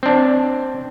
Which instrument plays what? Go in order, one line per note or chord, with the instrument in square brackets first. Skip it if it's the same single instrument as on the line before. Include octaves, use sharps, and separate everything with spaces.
[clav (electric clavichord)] C4 D4